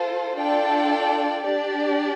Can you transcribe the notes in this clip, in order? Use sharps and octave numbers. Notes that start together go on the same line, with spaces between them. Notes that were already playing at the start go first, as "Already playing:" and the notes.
Already playing: F4 A4 C5
D4 F4 A4 D5 G5
D4 G4 D5